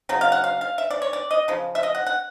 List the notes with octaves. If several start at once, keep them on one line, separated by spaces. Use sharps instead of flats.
C#3 F#3
F5
F#5
F5
F5
E5
D5
C#5
D5
D#5
C#3 F3
E5
D#5
F#5
F#5